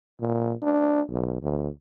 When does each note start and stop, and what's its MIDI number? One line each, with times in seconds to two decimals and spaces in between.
0.20 0.53 46
0.62 1.01 62
1.09 1.40 35
1.42 1.68 38